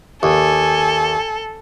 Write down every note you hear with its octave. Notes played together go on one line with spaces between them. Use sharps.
D#2 A4 G#5